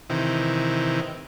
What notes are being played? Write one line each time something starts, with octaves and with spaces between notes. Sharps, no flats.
C3 D#3 E3